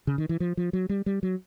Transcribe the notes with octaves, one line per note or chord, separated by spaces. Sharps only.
C#3
D#3
E3
F3
F3
F#3
G3
G3
F#3